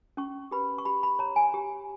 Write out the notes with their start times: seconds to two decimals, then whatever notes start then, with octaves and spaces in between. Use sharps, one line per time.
0.17 C#4 C#6
0.51 G4 B4 B5
0.78 C#6
0.85 G4 B5
1.03 B5
1.19 C#5 A#5
1.36 G#5
1.54 G4